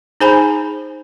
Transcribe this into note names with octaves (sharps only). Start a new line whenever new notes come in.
D#4 G#4 C5 G#5 A5 B5